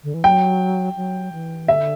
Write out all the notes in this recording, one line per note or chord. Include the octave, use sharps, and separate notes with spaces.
D3
E3
F#3 G5
F#3
E3
D3 E5